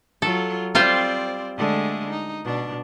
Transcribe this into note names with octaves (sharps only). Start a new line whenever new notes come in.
F#3 F4 A4
G3 C4 F4 C5 D5
D3 G#3 A3
D#4
B2 D4